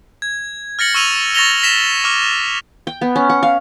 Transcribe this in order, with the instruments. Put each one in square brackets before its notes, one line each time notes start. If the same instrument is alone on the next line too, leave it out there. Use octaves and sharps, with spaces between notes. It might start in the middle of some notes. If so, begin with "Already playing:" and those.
[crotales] G#6
F6 A6 A#6 C#7 F#7
C#6 E6 D#7 F7
C#6 A6 A#6 F7 G7
A#6 B6 E7
C#6 D6 F6
[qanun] G5
B3
C#4
F#5
F5